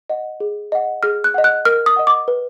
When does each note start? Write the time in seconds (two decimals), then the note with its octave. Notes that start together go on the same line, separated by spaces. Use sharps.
0.10 D#5 F#5
0.40 G#4
0.72 D#5 F#5
1.03 G#4 F6
1.24 F#6
1.34 D#5 F#5
1.44 F#6
1.65 A#4 F6
1.86 D#6
1.96 D#5 F#5
2.07 D6
2.28 B4